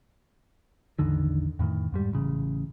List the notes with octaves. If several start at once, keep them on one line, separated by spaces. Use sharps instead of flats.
A1 E2 D3 D#3
F2 A2 D#3
F2 G#2 G3
A1 C#3